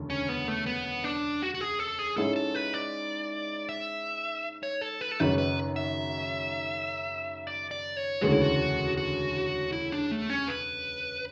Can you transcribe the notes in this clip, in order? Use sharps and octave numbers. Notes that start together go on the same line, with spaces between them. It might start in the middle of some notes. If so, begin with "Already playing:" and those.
Already playing: E1 D2 C#3
C#4
B3
A3
B3
D4
F#4
F#4
G#4
A4
G#4
G#2 G#3 C#4 E4 A4
A4
B4
D5
E5
C#5
A4
B4
A4
G#1 F#2 C#3 B4
B4
E5
D5
D5
C#5
E1 D2 C#3 E3 G#3 F#4
E4
F#4
F#4
E4
D4
A3
C#4
B4